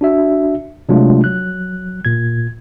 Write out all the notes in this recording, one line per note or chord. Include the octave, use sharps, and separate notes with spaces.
D4 F#4 E5
C3 F#3 G#3 A3 D4 F4
F#3 F#6
A#2 G#6